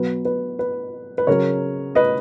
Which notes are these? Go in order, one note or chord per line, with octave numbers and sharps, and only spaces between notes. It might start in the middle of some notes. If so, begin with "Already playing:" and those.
Already playing: B2 F#3 B4
B4
B4
B4
C#3 F#3 A#4 C#5
B4 D#5